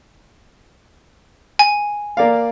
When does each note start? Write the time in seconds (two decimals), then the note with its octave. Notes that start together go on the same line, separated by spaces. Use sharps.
1.59 G#5
2.17 A#3 D5 F5